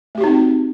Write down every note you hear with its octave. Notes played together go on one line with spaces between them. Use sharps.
A3 C4 D#4 F#4 G4